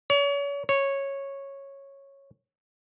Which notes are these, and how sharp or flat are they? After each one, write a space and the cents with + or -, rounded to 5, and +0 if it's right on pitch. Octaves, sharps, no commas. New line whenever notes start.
C#5 +35
C#5 -10